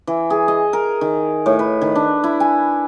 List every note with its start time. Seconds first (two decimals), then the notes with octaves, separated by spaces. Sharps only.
0.07 E3
0.30 G#4
0.48 D#5
0.73 A#4
1.01 D#3
1.46 A2
1.59 B4
1.81 D#3
1.95 D4
2.24 E4
2.40 G#5